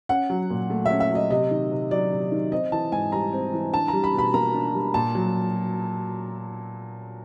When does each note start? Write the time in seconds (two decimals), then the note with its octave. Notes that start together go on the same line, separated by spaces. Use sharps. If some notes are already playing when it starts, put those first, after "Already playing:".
0.09 C#4 F#5
0.30 F#3
0.50 A#2
0.70 A3
0.86 C#4 E5
1.00 E5
1.11 F#3 D#5
1.30 C3 D#5
1.51 D#3
1.71 C3
1.91 F#3 D5
2.12 C3
2.32 D#3
2.51 C4 D#5
2.72 E3 A5
2.92 G#2 G#5
3.12 G3 A#5
3.33 C4
3.53 E3
3.73 D4 A5
3.88 A#5
3.93 G3
4.04 B5
4.14 B2 B5
4.34 A#3 A#5
4.54 D4
4.74 G3
4.94 A#2 A5
5.15 F#3